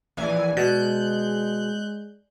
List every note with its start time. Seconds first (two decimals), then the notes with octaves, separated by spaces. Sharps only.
0.17 A#1 E3 D5 G#5
0.57 B2 G#3 F#6 G6